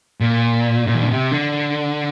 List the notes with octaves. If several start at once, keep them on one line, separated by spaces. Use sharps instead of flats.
A#2
A#2
D#3
D3
C3
D3